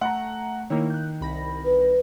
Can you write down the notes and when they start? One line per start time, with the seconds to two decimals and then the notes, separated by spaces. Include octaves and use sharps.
0.01 A3 F#5 A#5
0.70 D#3 A#3 E4 C#5
0.90 F#6 G6
1.21 C2 B5 A#6
1.65 B4